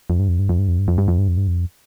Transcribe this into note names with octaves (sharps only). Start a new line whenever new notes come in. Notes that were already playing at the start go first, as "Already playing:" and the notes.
F2
G2
F2
G2
F2
G2
F2
G2
F2
G2
F2
G2
F2
G2
F2